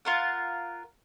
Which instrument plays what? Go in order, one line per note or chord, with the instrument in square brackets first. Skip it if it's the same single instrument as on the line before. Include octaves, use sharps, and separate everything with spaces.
[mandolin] F4 A#4 F#5